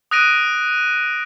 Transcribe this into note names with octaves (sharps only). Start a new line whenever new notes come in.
D#6 F#6 A#6 D7 D#7